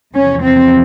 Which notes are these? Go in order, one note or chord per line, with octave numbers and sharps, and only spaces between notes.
E2 C3 F3 C#4
C4